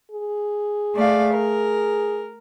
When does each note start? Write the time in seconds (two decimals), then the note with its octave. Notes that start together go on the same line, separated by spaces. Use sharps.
0.11 G#4
0.94 A3 D5 F5
1.32 A#4